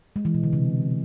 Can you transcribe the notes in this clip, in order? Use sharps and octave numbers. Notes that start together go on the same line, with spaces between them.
G#3
E3
B2
D3
C3